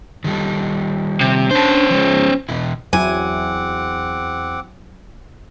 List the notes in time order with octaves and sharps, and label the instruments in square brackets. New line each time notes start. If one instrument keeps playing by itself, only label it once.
[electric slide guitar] D#3 G3 A4
[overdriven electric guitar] C3
[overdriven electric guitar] C#4 C5 [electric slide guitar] D4 A5
[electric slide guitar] F3 G#3
E2 B2 E4
[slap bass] E2 [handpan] F#3 E4 [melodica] C4 F#5 D6 [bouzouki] G#5